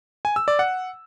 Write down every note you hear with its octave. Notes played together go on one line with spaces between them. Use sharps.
G#5
E6
D5
F#5